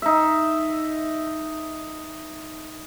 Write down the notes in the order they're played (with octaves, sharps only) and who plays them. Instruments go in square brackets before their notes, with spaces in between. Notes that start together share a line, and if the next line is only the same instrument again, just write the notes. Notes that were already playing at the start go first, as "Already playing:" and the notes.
[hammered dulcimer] D#4 E5